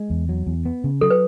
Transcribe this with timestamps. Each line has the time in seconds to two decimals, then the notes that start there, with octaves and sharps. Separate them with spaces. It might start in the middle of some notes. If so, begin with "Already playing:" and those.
Already playing: G#3
0.10 E2
0.29 F#3
0.47 E2
0.65 B3
0.84 C#3
1.01 F#3 A4
1.10 B4